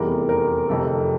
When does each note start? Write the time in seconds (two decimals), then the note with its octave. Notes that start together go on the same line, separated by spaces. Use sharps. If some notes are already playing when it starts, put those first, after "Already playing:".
Already playing: F1 E2 E3 G3 A#4
0.29 A#4
0.69 F1 F2 C3 A4